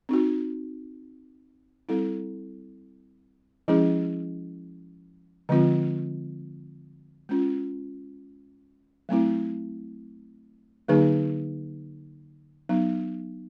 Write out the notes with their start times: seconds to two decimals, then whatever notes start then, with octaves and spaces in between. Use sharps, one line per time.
0.09 C4 D#4 F#4
1.89 G3 C4 E4 A4
3.68 F3 G#3 C#4 E4 G#4
5.49 D3 F3 G#3 C4 F4
7.29 G#3 C#4 F4
9.09 F#3 A3 C4 E4
10.88 D3 F#3 A#3 D#4 G#4
12.69 F#3 B3 D#4